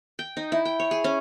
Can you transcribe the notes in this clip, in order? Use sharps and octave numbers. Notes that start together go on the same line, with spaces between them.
G5
D#4
E4
G5
C#5
G#4
C#4